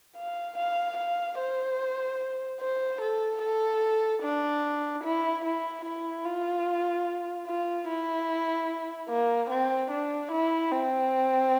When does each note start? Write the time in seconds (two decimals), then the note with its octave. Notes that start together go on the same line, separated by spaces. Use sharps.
0.16 F5
0.58 F5
0.98 F5
1.38 C5
2.60 C5
3.01 A4
3.42 A4
4.23 D4
5.04 E4
5.45 E4
5.85 E4
6.25 F4
7.47 F4
7.88 E4
9.09 A#3
9.50 C4
9.91 D4
10.32 E4
10.71 C4